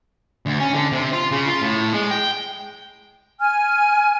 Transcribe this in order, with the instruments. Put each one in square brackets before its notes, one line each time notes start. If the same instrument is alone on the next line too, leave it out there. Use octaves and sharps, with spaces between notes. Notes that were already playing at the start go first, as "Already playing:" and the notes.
[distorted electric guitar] D2
C#4
D3
C3
F4
C#3
F4
A2
G#3
G5
[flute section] G#5 F6